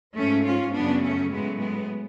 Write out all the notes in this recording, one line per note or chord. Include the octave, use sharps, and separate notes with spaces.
G#2 F3 A3 C#4
C#4 F4
F#2 C#3 F#3 B3 D4
A3 C#4
A2 F#3 G#3 B3
G#3 B3